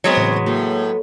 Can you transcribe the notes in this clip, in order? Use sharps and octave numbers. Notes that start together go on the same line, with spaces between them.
F#3 G#3 B3 C4 C#5
A2 C#3 E3
A2 A#3 F#4 G#4